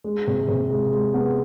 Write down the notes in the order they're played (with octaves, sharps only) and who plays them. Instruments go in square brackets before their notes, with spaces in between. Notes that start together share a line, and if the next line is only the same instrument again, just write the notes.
[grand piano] G#3
C3
C3
G#3
G#3
B3